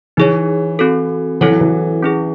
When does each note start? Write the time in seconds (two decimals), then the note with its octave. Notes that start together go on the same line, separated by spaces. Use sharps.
0.17 E3 D#4 G#4 C#5
0.79 C4 F#4 A4
1.41 E3 C4 E4 A4 C#5 F#5
1.51 F#3
1.61 E3
2.03 C#4 E4 G#4